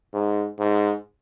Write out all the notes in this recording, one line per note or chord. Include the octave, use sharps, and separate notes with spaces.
G#2
G#2